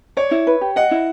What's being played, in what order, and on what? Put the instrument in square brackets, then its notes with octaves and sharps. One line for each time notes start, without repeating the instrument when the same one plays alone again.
[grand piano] C#5 [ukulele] D5
[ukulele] E4
B4
G4
[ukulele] D#5 [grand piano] F#5
[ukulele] E4